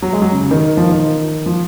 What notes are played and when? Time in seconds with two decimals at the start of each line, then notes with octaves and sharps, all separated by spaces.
0.02 F#3
0.13 G#3
0.22 F#3
0.32 C#3
0.42 C#3
0.51 D#3
0.77 F3
0.90 D#3
1.46 F3